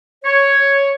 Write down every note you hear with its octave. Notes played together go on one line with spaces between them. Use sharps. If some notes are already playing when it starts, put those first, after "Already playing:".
C#5